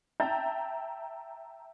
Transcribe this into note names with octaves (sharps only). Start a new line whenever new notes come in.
E5 G5 A5 A#5 G6 A6